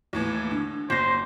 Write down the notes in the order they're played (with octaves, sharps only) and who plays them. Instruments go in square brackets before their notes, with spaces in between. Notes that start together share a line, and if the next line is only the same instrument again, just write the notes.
[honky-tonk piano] D#2 A2 E3
D3
[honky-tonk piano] F#1 A#6 [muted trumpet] C5